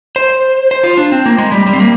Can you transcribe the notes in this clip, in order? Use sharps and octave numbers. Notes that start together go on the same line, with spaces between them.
C5
C5
F4
D4
C4
A#3
G#3
G3
G3
C4
A#3